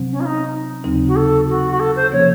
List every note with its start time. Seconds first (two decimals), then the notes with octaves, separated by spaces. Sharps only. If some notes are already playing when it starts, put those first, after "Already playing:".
Already playing: C3 F#3 C4
0.12 C#4
0.20 F4
0.25 D#4
0.84 D#2 C#3 F#3 C4 D#4
1.08 F#4
1.16 A4
1.49 F#4
1.71 F#4
1.80 A4
1.96 C5
2.12 C3 F3 A#3 C#4 C#5